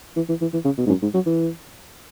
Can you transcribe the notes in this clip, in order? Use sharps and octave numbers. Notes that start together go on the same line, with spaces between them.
E3
E3
E3
E3
C#3
B2
G#2
F#2
G#2
F#3
E3